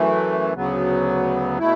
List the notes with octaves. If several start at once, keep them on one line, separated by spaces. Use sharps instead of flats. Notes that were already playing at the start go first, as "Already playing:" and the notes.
Already playing: F#2 E3 A3
D2 C#3 F#3 B3
B2 A3 E4